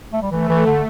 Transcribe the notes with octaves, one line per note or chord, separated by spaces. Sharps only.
A3
G3
E3 A3
E3
D3